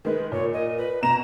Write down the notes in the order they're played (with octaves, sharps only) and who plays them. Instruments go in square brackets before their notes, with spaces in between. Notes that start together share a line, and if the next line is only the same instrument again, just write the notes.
[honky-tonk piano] D#3 G#3 [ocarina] B4
[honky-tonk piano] A#2 [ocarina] C#5
[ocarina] D#5
B4
[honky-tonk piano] B2 E7 [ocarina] A#5